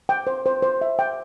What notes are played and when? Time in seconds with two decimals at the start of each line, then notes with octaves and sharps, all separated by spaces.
0.09 G5
0.27 C5
0.46 C5
0.62 C5
0.81 E5
0.99 G5